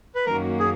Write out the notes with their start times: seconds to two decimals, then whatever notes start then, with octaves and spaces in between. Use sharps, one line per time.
0.15 B4
0.26 F#2 D#3 A#3 C#4 F#4 A#4
0.60 G#4